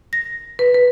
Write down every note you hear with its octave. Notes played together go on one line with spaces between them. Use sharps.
A#6
B4
B4